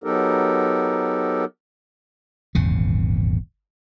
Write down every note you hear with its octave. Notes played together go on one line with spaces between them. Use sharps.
F#3 B3 D#4 G4 A4 A#4
D#1 G#1 E2 C#3